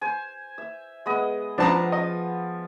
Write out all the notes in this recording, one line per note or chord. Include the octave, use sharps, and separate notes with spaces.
C5 G#5
E5
G#3 B3 D#5
F3 B3 D4 F5 A5 A#5
D#5